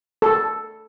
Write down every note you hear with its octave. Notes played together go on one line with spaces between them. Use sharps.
A4